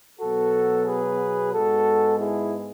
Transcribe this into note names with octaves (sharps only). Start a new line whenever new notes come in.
B2 F#3 B3 F#4 A4
G#4 B4
G#2 G#3 B3 F#4 A4
E4 G#4